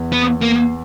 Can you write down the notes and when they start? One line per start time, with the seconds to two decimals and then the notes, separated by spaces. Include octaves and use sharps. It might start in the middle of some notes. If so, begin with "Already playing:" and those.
Already playing: E2
0.13 B3
0.42 A#3